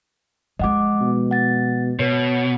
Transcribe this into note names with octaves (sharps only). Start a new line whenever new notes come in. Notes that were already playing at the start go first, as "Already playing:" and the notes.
F3 G#3 D#5 F#5 D6
B2
F#5 A6
B2 B4 C#5